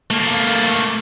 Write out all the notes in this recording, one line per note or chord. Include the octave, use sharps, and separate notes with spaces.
A3 A#3